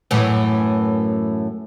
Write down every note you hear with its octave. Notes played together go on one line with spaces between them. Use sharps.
F#2 A2 E3